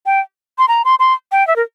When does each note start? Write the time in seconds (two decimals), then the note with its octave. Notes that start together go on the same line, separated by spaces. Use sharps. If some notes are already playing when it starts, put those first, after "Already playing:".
0.06 G5
0.58 C6
0.68 A#5
0.85 C6
0.99 C6
1.32 G5
1.47 E5
1.56 A#4